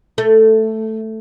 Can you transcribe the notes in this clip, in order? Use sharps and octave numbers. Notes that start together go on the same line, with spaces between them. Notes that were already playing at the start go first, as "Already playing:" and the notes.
A3